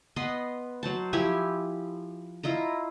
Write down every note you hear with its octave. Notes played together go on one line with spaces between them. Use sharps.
B3 B4 D#5 C6
F#3 C5 A5
F3 E4 G4 G#5
E4 F4 D#5 A#5